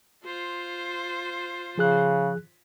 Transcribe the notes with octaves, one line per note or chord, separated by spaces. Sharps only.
F4 C5
C#3 F3 G#4 F#6